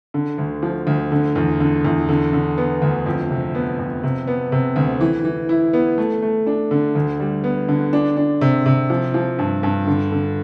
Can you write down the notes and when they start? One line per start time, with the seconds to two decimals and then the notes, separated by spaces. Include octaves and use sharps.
0.14 D3
0.38 D2
0.63 F3
0.87 D2
1.12 D3
1.36 E2
1.60 D3
1.85 E2
2.09 D3
2.33 D3
2.57 B3
2.82 D2
3.06 F2
3.30 C3
3.55 B3
3.79 F2
4.03 C3
4.27 B3
4.52 C3
4.76 D2
5.01 E3
5.25 E3
5.49 E4
5.73 B3
5.98 A3
6.22 A3
6.47 D4
6.71 D3
6.95 D2
7.20 G3
7.44 B3
7.69 D3
7.93 D4
8.17 D4
8.41 C3
8.66 C3
8.90 F3
9.14 F3
9.39 G2
9.63 G2
9.87 D3
10.12 D3